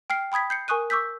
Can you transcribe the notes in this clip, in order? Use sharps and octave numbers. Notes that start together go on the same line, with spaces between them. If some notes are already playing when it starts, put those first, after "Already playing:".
G5 F6 C7
G5 B5 D#6 G#6 B6
G6 C7 C#7
A#4 G#5 C#6 D#6 F#6 D#7
C#6 D6 E6 G6 B6